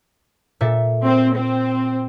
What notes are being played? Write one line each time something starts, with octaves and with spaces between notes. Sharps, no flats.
A#2 A4 E5
C4
C4